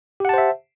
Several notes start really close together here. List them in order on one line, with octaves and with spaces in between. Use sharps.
G4 F#5 A5 C5 E5